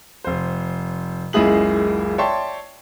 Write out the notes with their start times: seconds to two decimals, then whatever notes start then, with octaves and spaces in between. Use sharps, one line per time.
0.24 F1 C5
1.33 F#1 C#2 G#3 E4 G#4 F#7
2.18 C#5 D5 E5 G5 A5 C6